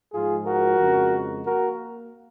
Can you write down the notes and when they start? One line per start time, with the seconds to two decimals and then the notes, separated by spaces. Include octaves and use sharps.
0.13 G#2 F3 G#3 F4 G#4
0.46 F#4 A#4
0.79 F2 C#3 G#3
1.46 A#3 F#4 A#4